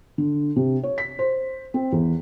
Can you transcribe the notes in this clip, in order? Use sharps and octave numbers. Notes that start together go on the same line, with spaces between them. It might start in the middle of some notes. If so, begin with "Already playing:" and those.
D3
C3
C#5
B6
C5
C4
E2